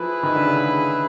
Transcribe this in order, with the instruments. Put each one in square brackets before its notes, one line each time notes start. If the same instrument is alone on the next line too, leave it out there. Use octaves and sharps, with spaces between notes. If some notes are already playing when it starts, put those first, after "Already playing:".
Already playing: [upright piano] F3 [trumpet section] E4 G#4 B4
[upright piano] D#3
D3
C#3